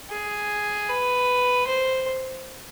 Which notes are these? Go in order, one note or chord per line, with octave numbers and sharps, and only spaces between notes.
G#4
B4
C5